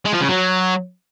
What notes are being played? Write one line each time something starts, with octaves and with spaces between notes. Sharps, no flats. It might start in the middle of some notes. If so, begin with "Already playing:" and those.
G#3
F3
C#3
F#3